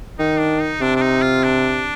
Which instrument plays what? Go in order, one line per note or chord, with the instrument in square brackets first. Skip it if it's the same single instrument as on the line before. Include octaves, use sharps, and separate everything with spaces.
[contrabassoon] D#3 [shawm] D#4
[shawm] D4
D#4
[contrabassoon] C3 [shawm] D4
[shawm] D4
D#4
F4
D4